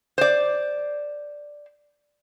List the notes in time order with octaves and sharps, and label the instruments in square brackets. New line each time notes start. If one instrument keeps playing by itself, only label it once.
[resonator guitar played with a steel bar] C5 D5